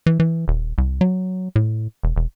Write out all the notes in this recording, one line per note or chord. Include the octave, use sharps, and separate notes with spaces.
E3
E3
D#1
C2
F#3
A2
E1
E1